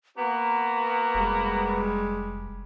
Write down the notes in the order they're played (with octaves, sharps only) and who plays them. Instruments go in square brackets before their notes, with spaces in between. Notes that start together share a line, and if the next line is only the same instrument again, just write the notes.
[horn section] A#3 B3 F#4 [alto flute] A#5
[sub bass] F1 [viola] G3 G#3